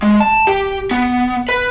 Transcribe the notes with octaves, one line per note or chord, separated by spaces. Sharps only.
G#3
A5
G4
B3
B4